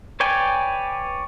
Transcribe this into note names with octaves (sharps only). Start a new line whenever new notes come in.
B4 C#5 D5 G5 G#5